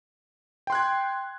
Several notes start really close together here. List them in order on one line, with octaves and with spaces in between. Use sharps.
G5 C6 F#6 G#6